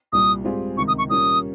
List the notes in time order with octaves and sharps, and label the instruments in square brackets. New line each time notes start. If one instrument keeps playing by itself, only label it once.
[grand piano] C2 A#2 G3 [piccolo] D#6
[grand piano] G#2 G3 C4 F4 G#4
[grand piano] C#2 C3 D#3 [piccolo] C#6
[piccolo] D#6
C#6
[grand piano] A#2 G3 A#3 C#4 [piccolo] D#6